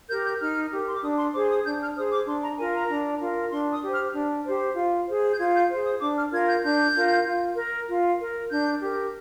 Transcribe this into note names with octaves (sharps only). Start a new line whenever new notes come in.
G4 A#4 G6
G6
D#4 F6
G4 A#4
C6
D6
D4 D#6
C6
G#4 C5 D6
D#6
D4 G6
F6
G#4 C5 D#6
D6
D4 C6
A#5
F4 A#4 G#5
A#5
D4
F4 A#4
D4 C6
D#6
G4 C5
F6
D4
G4 C5
F4
G#4 C5
G6
F4 G#6
G6
G#4 C5
D#6
D4 D6
F6
F4 A#4 G#6
G6
D4 G6
F4 A#4
F4
A#4
F4
A#4
D4 G6
G4 A#4